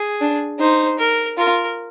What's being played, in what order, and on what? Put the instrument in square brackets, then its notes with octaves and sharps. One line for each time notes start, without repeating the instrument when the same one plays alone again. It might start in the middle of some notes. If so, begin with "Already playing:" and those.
Already playing: [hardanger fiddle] G#4
[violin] D4
[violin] D#4 [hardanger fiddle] C5
[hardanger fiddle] A#4
[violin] F4 [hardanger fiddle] A#4